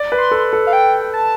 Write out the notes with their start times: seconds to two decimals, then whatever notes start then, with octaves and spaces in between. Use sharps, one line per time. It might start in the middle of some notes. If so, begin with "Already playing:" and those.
Already playing: D5
0.12 B4
0.18 C6
0.31 A4
0.53 A4
0.67 F5
0.73 G5
1.14 A5